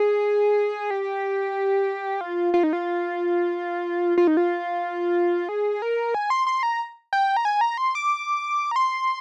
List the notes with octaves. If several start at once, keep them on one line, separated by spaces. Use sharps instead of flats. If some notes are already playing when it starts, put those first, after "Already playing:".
Already playing: G#4
G4
F4
F4
D#4
F4
F4
D#4
F4
G#4
A#4
G#5
C6
C6
A#5
G5
A#5
G#5
A#5
C6
D6
A#5
C6